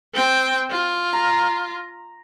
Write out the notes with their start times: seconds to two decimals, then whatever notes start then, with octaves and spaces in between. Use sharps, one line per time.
0.14 C4 G5
0.70 F4
1.13 A#5